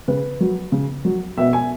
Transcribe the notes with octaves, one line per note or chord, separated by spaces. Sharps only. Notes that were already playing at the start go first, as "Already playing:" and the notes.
C#3 B4
F#3
C#3
F#3
B2 E5
G#5